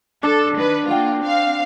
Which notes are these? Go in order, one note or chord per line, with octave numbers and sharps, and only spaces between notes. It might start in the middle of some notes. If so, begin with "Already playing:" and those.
D4 A4
D#3 B4
A#3 F4 F#5 G5
C4 F5 C7